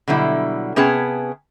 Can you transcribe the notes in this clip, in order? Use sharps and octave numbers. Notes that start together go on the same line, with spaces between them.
B2 D3 F#3 G3 E4
C3 B3 C#4 G#4 G5 A5